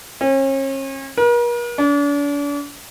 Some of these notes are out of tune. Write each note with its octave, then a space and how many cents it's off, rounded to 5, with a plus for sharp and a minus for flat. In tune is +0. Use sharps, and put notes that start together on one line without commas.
C#4 -40
A#4 +45
D4 -40